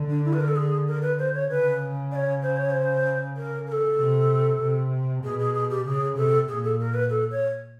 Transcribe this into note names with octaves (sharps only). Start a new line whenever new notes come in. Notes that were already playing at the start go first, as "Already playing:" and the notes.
Already playing: D3
D4
E4
B4
A#4
A4
G#4
A#4
B4
C5
C#5
C#3 B4
D5
C#5
C5
C#5
C5
A#4
A#4
A4
C3
C3
B2 G#4
G#4
G#4
G4
C#3 G#4
C3 A4
A#2 G#4
A4
A#4
B4
A4
C#5